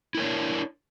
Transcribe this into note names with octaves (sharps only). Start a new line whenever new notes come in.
D4 E4 A#4 C#5